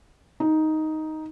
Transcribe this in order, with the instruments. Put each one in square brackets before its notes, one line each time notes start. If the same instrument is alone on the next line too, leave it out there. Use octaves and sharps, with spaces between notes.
[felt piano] D#4